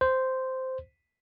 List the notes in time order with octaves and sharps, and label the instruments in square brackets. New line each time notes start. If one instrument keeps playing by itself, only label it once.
[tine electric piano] C5